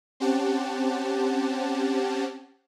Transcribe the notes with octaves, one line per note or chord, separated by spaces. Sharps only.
C4 C#4 G4 F#5 A5